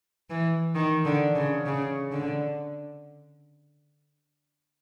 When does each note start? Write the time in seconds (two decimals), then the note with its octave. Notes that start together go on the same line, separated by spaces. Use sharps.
0.30 E3
0.75 D#3
1.05 D3
1.36 C#3
1.66 C#3
2.11 D3